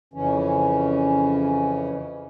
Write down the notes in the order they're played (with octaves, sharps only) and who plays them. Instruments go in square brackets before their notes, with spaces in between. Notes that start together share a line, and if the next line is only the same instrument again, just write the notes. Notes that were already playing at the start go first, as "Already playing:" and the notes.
[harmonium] F2 C#3 E3 C#4